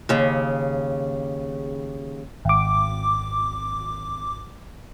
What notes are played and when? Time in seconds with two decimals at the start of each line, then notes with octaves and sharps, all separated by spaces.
0.09 D#2 C#3
2.45 G#1 D6